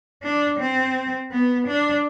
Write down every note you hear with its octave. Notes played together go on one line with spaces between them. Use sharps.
D4
C4
B3
D4